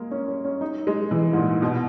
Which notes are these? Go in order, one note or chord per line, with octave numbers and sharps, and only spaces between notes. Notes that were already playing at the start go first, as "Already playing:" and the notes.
Already playing: G#3 A#3
C#4
C#4
C#4
D#4
G#3
E3
G#2
A#2
B2